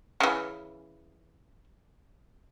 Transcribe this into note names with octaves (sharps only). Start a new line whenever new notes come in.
C#3 E3